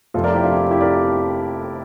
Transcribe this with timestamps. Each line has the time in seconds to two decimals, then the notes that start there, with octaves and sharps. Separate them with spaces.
0.14 F1 F2 C3 F4 A4
0.24 A#4 D5
0.33 E4 G4
0.42 D4 F4
0.53 E4
0.71 E4 G4
0.81 A#4 D5